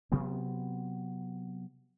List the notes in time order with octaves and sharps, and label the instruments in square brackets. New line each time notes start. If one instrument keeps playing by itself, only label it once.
[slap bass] C3 F#3 B3 C4